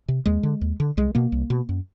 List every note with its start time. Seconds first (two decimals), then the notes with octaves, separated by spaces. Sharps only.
0.08 C3
0.26 D#2 G#3
0.43 D3
0.61 D#2
0.80 D3
0.97 C2 G#3
1.15 B2 A#3
1.32 C2
1.50 B2
1.69 F#2